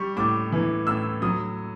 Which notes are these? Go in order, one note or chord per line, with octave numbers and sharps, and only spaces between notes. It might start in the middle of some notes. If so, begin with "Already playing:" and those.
Already playing: G3 C#6
A2 D6
E3
A2 E6
F#3 D#6